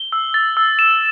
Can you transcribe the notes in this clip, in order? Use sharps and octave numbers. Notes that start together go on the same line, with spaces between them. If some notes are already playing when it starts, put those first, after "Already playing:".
Already playing: G7
E6
A6
E6
E7